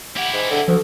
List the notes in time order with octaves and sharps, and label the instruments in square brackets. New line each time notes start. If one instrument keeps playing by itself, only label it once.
[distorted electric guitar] E4 G4 [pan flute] F#5
[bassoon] G#2
D3
[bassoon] D2 [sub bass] F3 [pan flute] A4